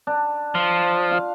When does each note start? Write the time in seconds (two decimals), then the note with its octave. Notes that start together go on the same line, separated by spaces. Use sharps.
0.07 D4
0.55 F3
1.11 F4 F5